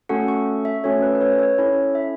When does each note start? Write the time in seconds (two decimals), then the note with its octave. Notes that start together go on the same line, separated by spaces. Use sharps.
0.09 A3 C#4 F#4 A4 F#5
0.28 C#6
0.65 E5
0.84 A3 C#4 F#4 A4 C#5
1.02 B4
1.15 B4
1.21 C#5
1.39 C#5
1.58 C#4 E4 A4 C#5
1.95 E5